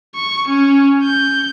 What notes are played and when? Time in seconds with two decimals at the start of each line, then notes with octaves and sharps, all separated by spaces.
0.15 C#6
0.48 C#4
1.03 G6